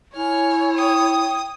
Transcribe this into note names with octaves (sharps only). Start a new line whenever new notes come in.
E4 C#5 G#5 F6
G5 D#6